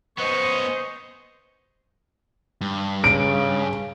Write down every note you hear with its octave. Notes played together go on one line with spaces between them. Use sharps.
B3 C#4 C5 D#5 C#6
G2
C#3 D7